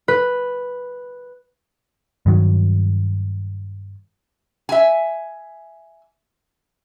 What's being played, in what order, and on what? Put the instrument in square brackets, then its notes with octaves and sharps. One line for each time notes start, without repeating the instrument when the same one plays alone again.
[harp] B4
[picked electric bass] G2 D#3 F#3
[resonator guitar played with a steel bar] E5 G#5